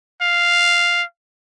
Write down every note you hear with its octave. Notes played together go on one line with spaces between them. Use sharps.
F5